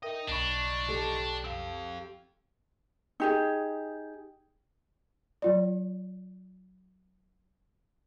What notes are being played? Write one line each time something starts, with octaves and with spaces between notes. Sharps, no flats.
D#4 A#4 D#5 E5 G5
B1 D4 D#4 C#5 B5
G4 A4
C4 F5
D#4 G4 G#4
F#3 F4 D5